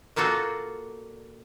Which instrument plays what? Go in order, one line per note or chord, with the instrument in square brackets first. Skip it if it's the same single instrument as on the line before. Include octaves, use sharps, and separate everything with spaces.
[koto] A#2 A#3 F4 F#4 A4